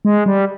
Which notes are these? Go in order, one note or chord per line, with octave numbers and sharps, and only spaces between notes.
G#3
G3